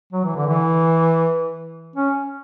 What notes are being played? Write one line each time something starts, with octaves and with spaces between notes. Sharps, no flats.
F#3
E3
D3
E3
C#4